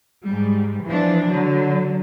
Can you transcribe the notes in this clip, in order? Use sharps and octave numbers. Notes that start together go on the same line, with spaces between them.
G#2 G3
E3 F3 D4
D3 F#3